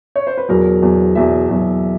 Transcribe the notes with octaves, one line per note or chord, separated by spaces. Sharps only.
C#5
C5
B4
E2 B2 F#3 A#4
E2 B2 F#3
E2 B2 F#3 E5
E2 B2 F#3